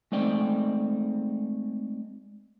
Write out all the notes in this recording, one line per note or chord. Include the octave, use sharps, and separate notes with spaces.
G#3 A3 C4 D#4 D5 G5